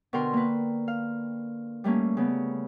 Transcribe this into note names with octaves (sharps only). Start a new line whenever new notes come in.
B2 D3 A#4 G5 C6
A#3 B4
F5
G3 A3 A#3 C#4
C#3 B3